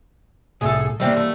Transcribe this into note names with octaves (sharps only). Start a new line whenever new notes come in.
C2 A2 G#4 A4
E3 G3 A3 A#3 C4 D4
A3